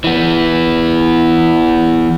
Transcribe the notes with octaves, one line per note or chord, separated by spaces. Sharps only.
E3 B3